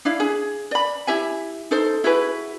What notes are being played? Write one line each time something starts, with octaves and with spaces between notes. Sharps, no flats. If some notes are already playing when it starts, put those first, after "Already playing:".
D4 E4 F5
G#4
D5 B5
E4 G4 E5 G#5
D#4 A4 C5
E4 F#4 G#4 B4